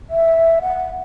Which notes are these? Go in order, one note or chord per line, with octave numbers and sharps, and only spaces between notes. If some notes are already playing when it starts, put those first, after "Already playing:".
E5
F#5